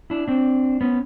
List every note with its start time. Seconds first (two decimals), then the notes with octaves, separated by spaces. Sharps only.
0.10 D4 E4
0.28 C4 D4
0.81 B3 C#4